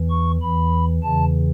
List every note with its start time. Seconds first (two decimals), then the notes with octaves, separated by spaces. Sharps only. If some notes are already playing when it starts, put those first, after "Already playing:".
Already playing: E2 E3
0.10 C#6
0.41 E2 E3 B5
1.03 E2 C#3 E3 A5